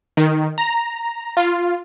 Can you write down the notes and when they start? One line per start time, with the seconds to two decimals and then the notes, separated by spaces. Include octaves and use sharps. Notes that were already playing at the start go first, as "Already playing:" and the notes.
0.17 D#3
0.58 A#5
1.37 F4